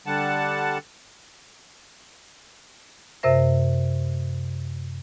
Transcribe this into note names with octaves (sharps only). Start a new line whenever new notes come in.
D3 G3 F#5 A5
F#2 C3 A#4 C5 E5 A#6